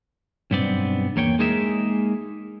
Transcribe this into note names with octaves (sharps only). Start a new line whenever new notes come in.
B1 G2 B3 C4 D5
E2 A#3 C#5 G5
G#3 A#3 D#4 G#4 A#4 E5